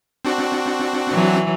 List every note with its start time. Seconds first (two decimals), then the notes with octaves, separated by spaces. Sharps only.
0.25 C4 D4 F#4
1.12 E3 F#3